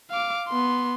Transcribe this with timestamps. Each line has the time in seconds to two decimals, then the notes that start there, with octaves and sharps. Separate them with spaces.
0.11 F5 D6
0.48 B3 C6